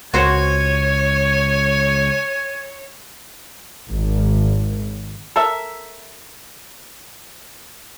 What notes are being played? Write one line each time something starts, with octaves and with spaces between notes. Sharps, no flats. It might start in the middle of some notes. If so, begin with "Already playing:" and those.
C#2 F#4 C5 C#5 F#5 G#5
G#1
A4 A#4 E5